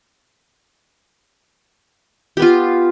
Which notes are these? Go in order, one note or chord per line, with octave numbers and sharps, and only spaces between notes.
B3 F4 G4